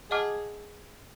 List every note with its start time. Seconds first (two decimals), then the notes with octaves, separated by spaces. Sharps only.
0.11 G#4 D#5 F#5 A5 D6 F6